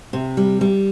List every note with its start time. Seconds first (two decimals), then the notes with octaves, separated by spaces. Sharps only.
0.13 C3
0.37 G3
0.61 G3